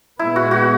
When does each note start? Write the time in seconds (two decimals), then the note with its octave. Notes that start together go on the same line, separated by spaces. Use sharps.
0.19 A#2 G#3 B3 E4
0.36 F#4
0.51 F#4